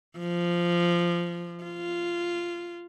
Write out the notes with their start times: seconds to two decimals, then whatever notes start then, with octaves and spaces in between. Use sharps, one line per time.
0.18 F3
1.64 F4